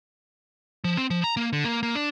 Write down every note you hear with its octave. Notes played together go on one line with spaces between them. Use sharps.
F3
C4
F3
A#5
A#3
D3
A#3
A#3
D4